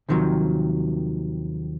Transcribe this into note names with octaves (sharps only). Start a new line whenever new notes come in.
D#2 C3 D#3 F3 F#3